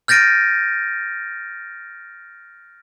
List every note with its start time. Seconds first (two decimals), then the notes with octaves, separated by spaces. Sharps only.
0.08 F6 G6 A6 A#6 D7 D#7